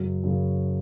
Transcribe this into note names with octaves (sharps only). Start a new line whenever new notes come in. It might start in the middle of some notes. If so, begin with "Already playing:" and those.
Already playing: F#2 C#3 F#3
F#2 C#3 F#3